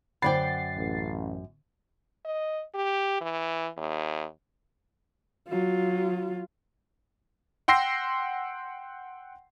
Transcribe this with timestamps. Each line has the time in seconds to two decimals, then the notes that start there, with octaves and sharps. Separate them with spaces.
0.22 F#2 D3 C5 D5 F#5 G5 A6 C7
0.76 A1
2.25 D#5
2.75 G4
3.21 E3
3.77 D#2
5.48 F#3 F4
7.68 F#5 G5 C6 E6 A#6 C7